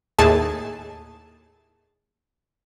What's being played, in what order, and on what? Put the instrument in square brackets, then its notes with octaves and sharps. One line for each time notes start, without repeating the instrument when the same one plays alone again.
[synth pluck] D#2 A2 G#4 A5